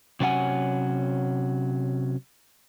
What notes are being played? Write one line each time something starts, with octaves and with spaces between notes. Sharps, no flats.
C3 F#3 C#4 G#4 F#5 G#5